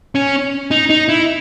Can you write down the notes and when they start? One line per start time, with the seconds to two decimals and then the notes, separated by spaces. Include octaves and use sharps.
0.15 C#4
0.71 D#4
0.90 D#4
1.09 E4